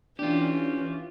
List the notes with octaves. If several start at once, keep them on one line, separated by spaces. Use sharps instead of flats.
E3 C#4 D4 F4 G4